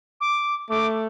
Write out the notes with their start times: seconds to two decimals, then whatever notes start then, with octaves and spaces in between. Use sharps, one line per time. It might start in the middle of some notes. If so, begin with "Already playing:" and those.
0.20 D6
0.70 A3 D6